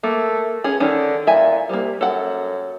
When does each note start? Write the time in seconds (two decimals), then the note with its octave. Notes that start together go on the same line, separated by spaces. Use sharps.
0.03 A3 A#3
0.64 C#2 C#4 G#4
0.80 D3 D#3 C#4
1.27 A#2 E4 E5 G#5
1.69 C2 G3 A#3
2.01 F#2 A4 F#5